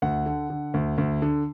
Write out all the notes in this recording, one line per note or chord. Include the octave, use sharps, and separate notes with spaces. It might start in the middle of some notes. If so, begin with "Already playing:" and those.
D2 F#5
D3
D3
D2
D2
D3